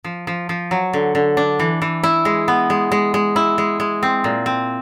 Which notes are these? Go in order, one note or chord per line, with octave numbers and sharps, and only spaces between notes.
F3
F3
F3
F#3
D3
D3
D4
E3
E3
E4
G#3
B3
G#3
G#3
G#3
E4
G#3
G#3
C4
A#2
C4